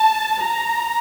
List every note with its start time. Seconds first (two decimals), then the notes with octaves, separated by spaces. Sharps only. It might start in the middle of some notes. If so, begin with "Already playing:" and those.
Already playing: A5
0.42 A#5